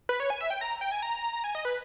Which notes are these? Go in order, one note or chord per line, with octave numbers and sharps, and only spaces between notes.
B4
C#5
G#5
E5
G5
A#5
G5
G#5
A#5
A#5
G#5
D#5
B4